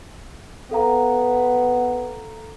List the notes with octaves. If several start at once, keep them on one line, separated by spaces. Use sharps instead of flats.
B3 A4 F5 A#5